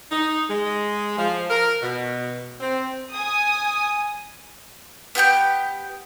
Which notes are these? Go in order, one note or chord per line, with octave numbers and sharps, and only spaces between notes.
D#4
G#3
F3
A#4
B2
C4
G#5 D#6
B3 G4 G5 G6